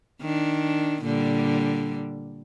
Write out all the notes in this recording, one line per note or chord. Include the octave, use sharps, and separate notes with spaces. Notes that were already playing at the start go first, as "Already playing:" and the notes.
D#3 D4
A#2 D3 G3